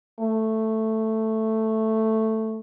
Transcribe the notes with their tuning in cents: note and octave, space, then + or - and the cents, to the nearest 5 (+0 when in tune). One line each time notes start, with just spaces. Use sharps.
A3 +5